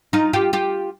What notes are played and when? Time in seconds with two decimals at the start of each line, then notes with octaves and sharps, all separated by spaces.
0.13 D#4 F4
0.33 F4 G4
0.53 F4 G4